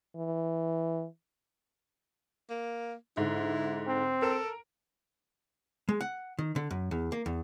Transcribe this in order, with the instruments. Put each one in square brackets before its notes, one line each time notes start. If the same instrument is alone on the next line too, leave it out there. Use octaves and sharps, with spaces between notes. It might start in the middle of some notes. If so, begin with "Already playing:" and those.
[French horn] E3
[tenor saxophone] A#3
[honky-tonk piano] G#2 D3 [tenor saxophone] E4
[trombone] C4
[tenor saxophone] A4 [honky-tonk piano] A#4
[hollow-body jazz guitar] G#3
F#5
D#3
D3
F#2
E2
A#3
E2